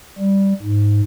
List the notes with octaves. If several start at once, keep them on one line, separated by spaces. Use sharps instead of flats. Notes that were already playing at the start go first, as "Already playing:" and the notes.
G3
G#2